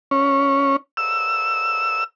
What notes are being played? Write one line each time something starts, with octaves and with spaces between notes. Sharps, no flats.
C#4
E6